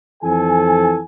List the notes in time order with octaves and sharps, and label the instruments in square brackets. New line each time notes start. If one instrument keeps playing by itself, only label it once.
[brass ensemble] F2 E3 A4 G#5